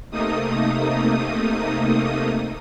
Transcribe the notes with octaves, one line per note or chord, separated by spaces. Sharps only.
C3 A3 A#3 D#4 D#6